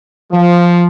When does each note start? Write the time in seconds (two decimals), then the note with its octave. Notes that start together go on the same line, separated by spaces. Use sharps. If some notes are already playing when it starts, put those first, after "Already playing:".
0.32 F3